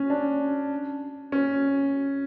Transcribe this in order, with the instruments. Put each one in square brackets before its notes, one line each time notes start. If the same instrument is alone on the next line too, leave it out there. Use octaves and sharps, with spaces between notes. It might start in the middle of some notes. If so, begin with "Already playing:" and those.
Already playing: [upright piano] C#4
D4
C#4